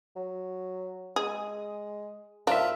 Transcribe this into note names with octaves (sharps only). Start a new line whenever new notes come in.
F#3
G#3 G#4 D#6
G#2 D4 F4 A#4 E5